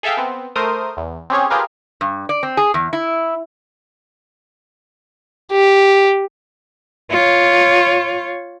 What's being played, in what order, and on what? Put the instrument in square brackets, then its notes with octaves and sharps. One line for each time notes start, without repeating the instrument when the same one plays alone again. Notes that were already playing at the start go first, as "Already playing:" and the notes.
[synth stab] G#4 A4 E5 F5 G5
B3 C4
A3 A#4 C5 D#6
E2
C4 C#4 G4 G#4 C#5
F4 G4 G#4 A#4 B4 F5
[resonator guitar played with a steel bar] G2
D5
C4
G#4
E2
E4
[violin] G4
[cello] F4 C#5